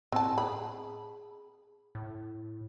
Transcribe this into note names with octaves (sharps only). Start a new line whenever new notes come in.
A2 C4 A5
G#4 B5
A2